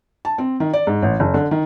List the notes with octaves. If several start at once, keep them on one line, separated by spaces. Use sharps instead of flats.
A5
C4
D#3
D5
G#2
A1
F#1
D3
D#3